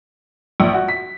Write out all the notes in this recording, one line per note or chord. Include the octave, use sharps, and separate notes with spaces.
A#1
F#4
B6